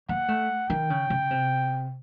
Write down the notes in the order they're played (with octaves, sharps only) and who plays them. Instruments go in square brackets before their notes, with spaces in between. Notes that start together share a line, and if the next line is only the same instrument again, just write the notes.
[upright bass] A#3 [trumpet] F#5
[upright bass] A3
[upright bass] D#3 [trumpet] G5
[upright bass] C#3
C#3
C3